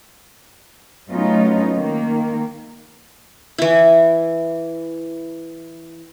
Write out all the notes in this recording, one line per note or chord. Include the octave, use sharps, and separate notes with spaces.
F#3 A3 B3 C#4 D#4 F4
D#3 A#3
E3 E4